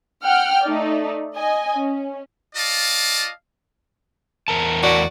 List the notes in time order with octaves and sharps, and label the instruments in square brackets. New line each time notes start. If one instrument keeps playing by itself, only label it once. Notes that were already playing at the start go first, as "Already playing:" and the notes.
[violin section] F#5 G5 F6
A3 D#4 D5
D#5 G#5
C#4
[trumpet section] F4 D5 D#5 F5 A5
[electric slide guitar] E2 A#4 A5
[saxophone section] A2 F#4 D5